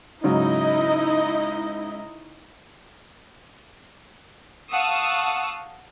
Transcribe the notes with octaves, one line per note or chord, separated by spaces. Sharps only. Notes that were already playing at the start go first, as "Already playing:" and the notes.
G#2 C#3 F#3 D#4 E4 D#5
F5 F#5 A5 C#6 D#6 E6